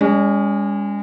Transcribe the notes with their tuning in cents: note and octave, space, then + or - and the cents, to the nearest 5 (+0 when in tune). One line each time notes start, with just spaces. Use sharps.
G#3 -35 C#4 +30